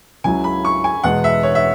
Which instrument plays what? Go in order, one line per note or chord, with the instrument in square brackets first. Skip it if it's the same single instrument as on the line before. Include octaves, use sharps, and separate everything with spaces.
[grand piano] C#2 C#3 F#3 E4 [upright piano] G#5
[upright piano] B5
C#6
G#5
[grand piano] E2 B2 G#3 B3 [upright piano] F#5
[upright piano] E5
C#5
E5